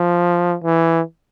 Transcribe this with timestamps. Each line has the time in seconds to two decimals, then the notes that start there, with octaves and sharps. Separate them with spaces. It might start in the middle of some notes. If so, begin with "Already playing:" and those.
Already playing: F3
0.64 E3